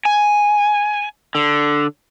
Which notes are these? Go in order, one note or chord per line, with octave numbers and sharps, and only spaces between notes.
G#5
D3